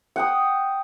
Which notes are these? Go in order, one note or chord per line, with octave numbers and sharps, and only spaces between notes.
F#5 G5 D#6